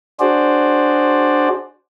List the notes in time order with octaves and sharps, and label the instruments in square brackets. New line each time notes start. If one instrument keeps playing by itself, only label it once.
[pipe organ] D4 F#4 G#4 C5 D5